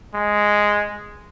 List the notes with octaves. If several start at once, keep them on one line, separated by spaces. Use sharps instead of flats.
G#3